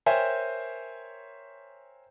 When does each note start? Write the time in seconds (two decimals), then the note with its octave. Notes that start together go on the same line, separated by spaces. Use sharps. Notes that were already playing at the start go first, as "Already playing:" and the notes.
0.06 A#4 C5 C#5 E5 G5 G#5